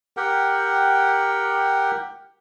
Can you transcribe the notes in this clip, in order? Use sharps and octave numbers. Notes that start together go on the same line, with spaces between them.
G4 A#4 F#5 G5